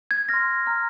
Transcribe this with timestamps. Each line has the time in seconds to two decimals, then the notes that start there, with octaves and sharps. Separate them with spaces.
0.11 G#6
0.29 C6 F6 A#6
0.66 A#5 F6